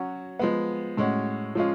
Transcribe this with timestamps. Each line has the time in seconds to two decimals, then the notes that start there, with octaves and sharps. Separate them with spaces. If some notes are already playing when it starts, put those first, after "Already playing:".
Already playing: F#3 C#4 F#4
0.39 F3 G#3 B3
0.97 A2 G#3 C#4 F#4
1.55 F3 G#3 C#4 F4